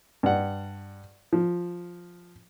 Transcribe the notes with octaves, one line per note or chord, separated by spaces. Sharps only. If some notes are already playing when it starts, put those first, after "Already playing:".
G2 F#5
F3